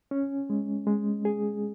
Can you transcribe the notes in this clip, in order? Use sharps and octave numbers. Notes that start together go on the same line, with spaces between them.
C#4
G#3
G#3
G#4